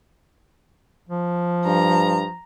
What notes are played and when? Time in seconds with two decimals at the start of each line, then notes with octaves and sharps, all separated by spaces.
1.09 F3
1.66 G2 A#5